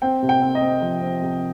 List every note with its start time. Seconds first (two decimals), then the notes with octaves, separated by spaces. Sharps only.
0.02 C4 G5
0.22 C3
0.29 G5
0.41 C4
0.55 D#5
0.61 C4
0.82 F3
1.02 C4
1.22 C3